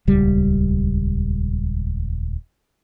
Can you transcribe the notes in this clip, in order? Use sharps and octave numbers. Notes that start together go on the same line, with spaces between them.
D#1 C#2 G3